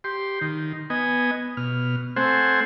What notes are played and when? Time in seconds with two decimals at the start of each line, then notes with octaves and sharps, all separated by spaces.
0.04 G4 C6
0.41 D#3
0.90 B3 D#5 G#5
1.57 B2 F6
2.16 A3 C4 C5 F#5 G#5